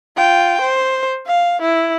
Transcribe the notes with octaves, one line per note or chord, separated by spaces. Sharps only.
F4 G5
C5
F5
E4